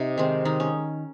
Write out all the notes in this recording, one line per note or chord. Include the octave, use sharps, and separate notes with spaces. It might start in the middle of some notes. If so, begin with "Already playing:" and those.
Already playing: C3 D#4
D#3 G#3 C4
D#3 D#4
C#4